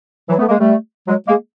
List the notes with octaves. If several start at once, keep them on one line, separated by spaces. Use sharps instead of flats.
E3 F#3
A3 B3
G#3 A#3
G3 A3
F#3 G#3
G#3 A#3